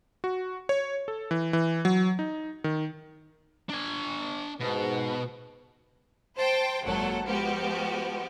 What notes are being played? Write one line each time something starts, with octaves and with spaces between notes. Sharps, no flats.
F#4
C#5
A4
E3
E3
F#3
D#4
D#3
D4 G#5
G#2 B2 B4
C5 G5 A5 C6
G#1 F#2 A#2 F#3 A4 F#5
F3 G#3 B3 F#4 G4